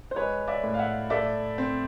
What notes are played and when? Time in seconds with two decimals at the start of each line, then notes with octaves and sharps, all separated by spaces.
0.11 C5
0.16 G#3 B4 C#5
0.48 D5 E5
0.63 A2
0.74 F5
0.79 E5 F#5
1.10 A3 D5 E5
1.58 C4